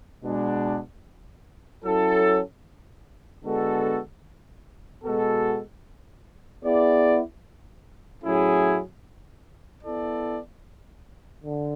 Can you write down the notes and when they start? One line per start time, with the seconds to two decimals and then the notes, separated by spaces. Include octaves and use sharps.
0.24 B2 G#3 D4
1.84 F#3 C#4 E4 A4
3.44 D3 G#3 B3 F#4 A4
5.04 B2 G#3 B3 F#4 A4
6.64 B3 E4 G#4 D5
8.24 A2 F#3 C#4 E4 G#4
9.84 B3 E4 A4 D5
11.44 D3